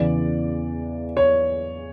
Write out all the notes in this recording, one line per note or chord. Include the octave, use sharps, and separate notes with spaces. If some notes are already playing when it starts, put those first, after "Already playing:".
Already playing: E2 C#3 E3 D5
C#5